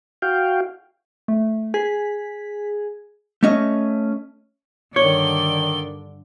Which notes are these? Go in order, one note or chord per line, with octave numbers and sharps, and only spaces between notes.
F#4 F5 G5
A3
G#4 B6
A3 C#4 D#5
G2 D3 D#3 C#5 D5 G7